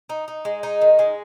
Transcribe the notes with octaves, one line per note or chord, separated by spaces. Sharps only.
D#4
D#4
G#3
D#4
D#3
G#3